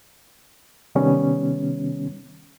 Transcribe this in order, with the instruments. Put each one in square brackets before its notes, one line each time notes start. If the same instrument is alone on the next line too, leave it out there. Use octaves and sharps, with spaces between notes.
[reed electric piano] C3 D#3 G3 B3 C#4